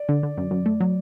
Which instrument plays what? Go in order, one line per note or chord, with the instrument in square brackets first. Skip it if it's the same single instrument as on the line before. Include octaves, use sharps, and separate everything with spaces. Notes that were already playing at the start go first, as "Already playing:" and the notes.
Already playing: [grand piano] D5
[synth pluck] D3
D3
F#2
F#2
A3
F#3